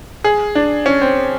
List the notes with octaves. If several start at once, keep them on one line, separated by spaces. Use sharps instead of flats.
G#4
D4
C#4
C4